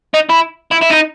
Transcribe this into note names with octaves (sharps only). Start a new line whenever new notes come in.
D#4
E4
E4
E4
D#4